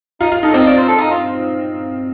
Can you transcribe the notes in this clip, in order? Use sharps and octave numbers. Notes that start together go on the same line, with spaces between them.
D#4 F4
F4
D#4 A4
C4 D#5
D5
C5
A4
D#4
F4